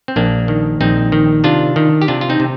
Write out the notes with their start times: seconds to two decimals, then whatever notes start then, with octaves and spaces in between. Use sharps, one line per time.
0.08 C4
0.16 A#1 A#3 D4
0.48 D#3
0.81 A#1 C4 D#4
1.12 D#3
1.44 C3 D4 F4
1.76 D#3
2.02 G4
2.08 C3 D4 F4
2.21 F4
2.29 C4 D#4
2.40 C3